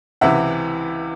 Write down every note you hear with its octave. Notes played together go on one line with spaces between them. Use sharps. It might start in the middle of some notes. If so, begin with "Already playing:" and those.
C#2 C3 E3 E5 F#5